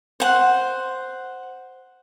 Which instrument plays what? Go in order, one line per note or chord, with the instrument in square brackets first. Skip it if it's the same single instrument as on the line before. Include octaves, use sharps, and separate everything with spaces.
[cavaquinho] C5 F#5